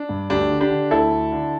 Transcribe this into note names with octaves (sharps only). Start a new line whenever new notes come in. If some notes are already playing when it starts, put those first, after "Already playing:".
Already playing: D4
G2
D2 D4 G4
D3
D4 G4
D3
D2 E4 A4
D2
D3